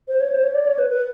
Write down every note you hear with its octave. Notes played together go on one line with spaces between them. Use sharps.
C5
C#5
C5
C#5
D5
C#5
B4
B4